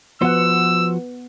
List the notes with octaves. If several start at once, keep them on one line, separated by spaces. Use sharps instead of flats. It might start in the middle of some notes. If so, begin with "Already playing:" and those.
F3 B3 F#4 C5 F#5 E6